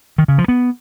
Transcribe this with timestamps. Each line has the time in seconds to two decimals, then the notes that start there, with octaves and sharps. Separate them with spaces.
0.18 D#3
0.28 C#3
0.38 F3
0.48 B3